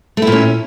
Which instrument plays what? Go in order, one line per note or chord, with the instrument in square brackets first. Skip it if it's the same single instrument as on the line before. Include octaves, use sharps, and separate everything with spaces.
[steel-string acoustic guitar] A3
E4
A#2
C#4